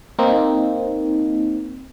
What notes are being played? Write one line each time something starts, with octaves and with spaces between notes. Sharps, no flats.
A#3 C4 D#4